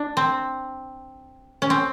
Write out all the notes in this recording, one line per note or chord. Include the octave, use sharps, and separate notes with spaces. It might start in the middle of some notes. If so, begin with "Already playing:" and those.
Already playing: D4
C4
C#4
C4